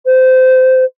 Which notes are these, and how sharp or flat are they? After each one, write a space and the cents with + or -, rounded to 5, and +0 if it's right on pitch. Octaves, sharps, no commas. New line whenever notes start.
C5 -20